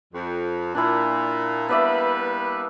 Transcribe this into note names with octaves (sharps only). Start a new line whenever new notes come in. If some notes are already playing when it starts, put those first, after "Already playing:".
F2
A#2 D4 E4
G3 A#3 B3 B4 D5 E5